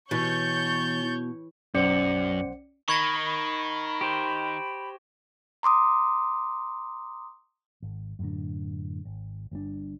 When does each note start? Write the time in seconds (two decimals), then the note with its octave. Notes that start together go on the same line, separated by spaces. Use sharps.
0.11 B2 E3 C#5 C#6 G6 A6
1.74 B1 F#2 C#4 C5 D5 F#5 C#7
2.88 D#3 B5 C#6 G#6 A#6
3.26 B5
4.01 G4 C5
5.63 A#5 C6 D6 D#6
7.82 G#1
8.19 F#2 A2 D3
9.05 G#1
9.51 G1 G2 A#2 D4